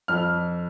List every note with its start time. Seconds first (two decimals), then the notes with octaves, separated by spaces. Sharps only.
0.08 F2 F6